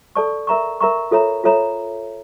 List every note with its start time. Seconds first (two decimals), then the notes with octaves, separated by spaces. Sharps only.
0.15 A4 D5 A5 C#6
0.47 A#4 E5 A#5 C#6
0.81 A#4 E5 A#5 C#6
1.11 F4 A4 C#5 E5 A#5
1.44 F4 A4 C#5 E5 A#5